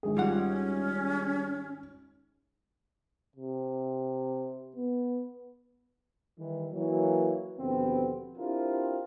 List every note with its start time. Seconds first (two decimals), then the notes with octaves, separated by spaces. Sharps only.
0.03 G#1 G#4
0.17 G3 C#4 F4 F#5
3.36 C3
4.76 B3
6.38 D#3 E3 G3
6.72 E3 F#3 A#3
7.58 D#2 B2 D3 F3 B3 C4
8.37 C4 D4 E4 F4 G4 A#4